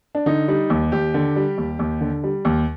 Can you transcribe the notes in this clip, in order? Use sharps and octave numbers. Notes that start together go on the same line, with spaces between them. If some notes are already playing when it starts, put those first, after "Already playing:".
D4
D3 D#4
G3 D#4
D#2
D#2 G4
D3
G3
D#2
D#2
D3
G3
D#2